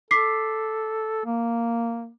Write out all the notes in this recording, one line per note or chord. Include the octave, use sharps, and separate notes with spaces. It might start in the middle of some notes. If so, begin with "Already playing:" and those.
A4 D6 B6 C7
A#3